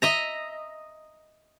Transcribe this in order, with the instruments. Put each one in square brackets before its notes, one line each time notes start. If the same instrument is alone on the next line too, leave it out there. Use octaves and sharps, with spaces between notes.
[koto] D#5 E5 A#5